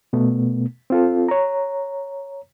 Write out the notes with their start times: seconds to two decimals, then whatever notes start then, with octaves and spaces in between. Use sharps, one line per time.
0.13 B2 A3 B3
0.90 C4 F4 A4
1.29 C#5 A#5